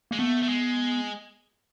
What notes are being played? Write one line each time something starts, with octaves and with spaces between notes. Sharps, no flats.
G#3 A#3
A3 B3
A3
G#3